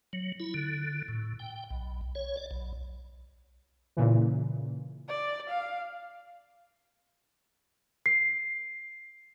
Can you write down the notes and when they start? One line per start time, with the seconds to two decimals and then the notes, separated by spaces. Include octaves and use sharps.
0.13 F#3
0.40 E4
0.54 D3
1.08 A2
1.39 G5
1.70 B1
2.15 C#5
2.37 D5
2.51 B1
3.97 A#2 C#3 E3
5.09 D5
5.50 F5
8.06 C7